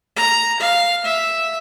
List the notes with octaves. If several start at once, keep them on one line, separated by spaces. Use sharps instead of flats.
A#5
F5
E5